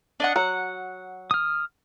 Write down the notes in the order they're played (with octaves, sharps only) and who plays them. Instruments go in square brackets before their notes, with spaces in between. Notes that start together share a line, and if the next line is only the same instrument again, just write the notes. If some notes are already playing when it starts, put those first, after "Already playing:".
[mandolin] D4 D#5 F#5
[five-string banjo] F#3 [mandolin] F#5
[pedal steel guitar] D#6 F6